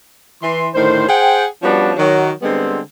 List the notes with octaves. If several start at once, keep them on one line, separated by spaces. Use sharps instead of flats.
E3 C6
A2 D3 D#3 C5
G#4 C5 F#5 G5
F3 G3 B3 C#4 D4 F#4
D#3 F#3 F#4
D3 G3 G#3 B3 C4